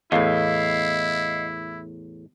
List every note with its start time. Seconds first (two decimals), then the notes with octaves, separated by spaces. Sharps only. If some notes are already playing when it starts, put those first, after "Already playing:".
0.12 E2 A2 E4 D#5 F5